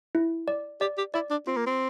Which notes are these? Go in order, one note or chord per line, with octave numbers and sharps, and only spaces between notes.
E4
D5
G4 D5
G4
E4 D5
D4
C4 F4
A#3
C4